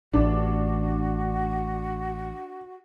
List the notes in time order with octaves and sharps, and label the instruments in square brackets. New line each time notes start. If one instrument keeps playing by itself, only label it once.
[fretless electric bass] A1 [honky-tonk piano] D4 [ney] F#4